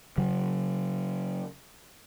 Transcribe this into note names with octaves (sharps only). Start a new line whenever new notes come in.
C#3 F#3